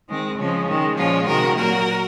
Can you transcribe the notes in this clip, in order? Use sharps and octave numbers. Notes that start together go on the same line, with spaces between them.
D#3 G#3 C4
C#3 F3 G#3 C#4
D#3 G#3
A#2 F3 G#3 C#4 F4
C3 D#3 G#3 F#4 A#4
A#2 F#3 A#3 F#4 A#4